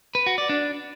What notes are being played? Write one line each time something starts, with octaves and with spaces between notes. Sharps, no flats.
B4
F#4
D5
D4